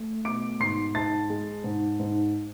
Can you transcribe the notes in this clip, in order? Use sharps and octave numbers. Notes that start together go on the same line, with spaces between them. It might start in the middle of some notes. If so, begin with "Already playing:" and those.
Already playing: A3
B2 D6 D7
G#2 C6 C7
G#2 A5 A6
G#3
G#2
G#2